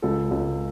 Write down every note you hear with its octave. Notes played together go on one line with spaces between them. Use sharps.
C#2 A4
C#2